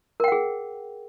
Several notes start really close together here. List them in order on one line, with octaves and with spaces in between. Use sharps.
A#4 G5 F#5 G#4